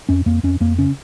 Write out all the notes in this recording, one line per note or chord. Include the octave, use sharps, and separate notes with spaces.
F2 C#4
F2 A#3
F2 C#4
F2 A#3
C#3 C#4